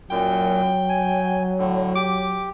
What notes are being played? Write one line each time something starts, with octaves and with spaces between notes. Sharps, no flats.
F#2 A#2 F#3 G5
G#5
A2 D3
G4 D6